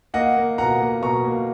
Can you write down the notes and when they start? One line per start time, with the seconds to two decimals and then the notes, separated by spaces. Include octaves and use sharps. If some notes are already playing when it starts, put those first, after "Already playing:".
0.14 A#3 D#5 F#5
0.37 A#3
0.58 B2 F#5 A#5
0.80 A#3
1.02 B2 A#5 C#6
1.25 A#3